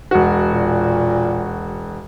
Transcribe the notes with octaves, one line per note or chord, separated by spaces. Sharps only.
E1 F#4
A#2